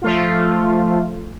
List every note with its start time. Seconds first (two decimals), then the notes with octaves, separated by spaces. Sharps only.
0.02 F3 A3 F4